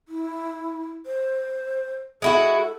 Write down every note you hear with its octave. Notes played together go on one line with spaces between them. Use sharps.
E4
C5
G#3 E4 F#4 A4